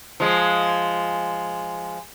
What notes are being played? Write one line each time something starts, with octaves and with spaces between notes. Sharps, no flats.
F3 G#3